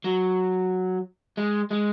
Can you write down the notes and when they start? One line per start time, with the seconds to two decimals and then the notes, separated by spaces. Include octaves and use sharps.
0.04 F#3
1.37 G#3
1.71 G#3